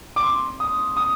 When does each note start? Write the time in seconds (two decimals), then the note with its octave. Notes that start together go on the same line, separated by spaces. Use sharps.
0.16 D6
0.23 C6
0.60 D#6
0.97 D#6